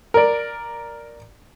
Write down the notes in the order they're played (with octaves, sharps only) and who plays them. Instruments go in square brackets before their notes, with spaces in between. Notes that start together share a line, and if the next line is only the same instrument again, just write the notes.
[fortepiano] A#4 D5